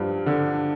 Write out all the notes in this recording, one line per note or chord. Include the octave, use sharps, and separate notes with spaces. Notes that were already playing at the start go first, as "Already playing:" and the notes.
Already playing: G2 F3
D3